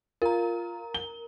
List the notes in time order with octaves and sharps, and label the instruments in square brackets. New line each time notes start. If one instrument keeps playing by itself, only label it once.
[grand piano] F4 [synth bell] A#4 A#5
[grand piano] G7